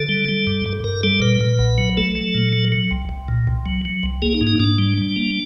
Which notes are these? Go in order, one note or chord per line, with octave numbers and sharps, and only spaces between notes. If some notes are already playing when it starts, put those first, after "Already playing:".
Already playing: D3 A4
G3
G3
G2
G2
G2 A#4
G3 A4
A#2 B4
A#2
B1
F#3
A3 A4
F#3
A#2
F#3
F#3
C2
C2
A#2
C2
F#3
F#3
C2
A#3 G#4
D#4
G#2
D#4
G#2 D4
G3
G3
A#3